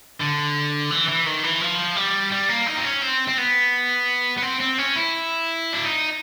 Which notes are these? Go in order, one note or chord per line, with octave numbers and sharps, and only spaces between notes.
D3
E3
E3
D#3
E3
F3
G3
G3
A#3
D#4
C4
C#4
C4
C4
B3
B3
C4
C4
C#4
E4
D4
D#4